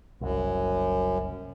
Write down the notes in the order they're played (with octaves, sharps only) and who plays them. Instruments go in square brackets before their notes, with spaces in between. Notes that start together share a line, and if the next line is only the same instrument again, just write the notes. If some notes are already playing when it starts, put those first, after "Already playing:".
[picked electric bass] F#1 C2 [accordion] F#2